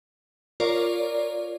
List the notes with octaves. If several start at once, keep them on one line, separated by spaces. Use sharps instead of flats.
F4 A#4 C#5 D5